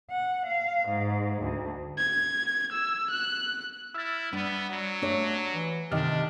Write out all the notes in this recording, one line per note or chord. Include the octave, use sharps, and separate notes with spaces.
F#5
F5
G#2
D2
G#6
E6
F#6
E4 E6 F6 A6
G3 B3 D4
F#3
A3 D4 G4 C#5
E3
D2 C3 D#3 D4 G4 D#5 F6